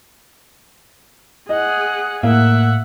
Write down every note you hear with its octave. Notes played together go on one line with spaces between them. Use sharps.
G#4 D#5 F#5
A2 A#3 E5 F#5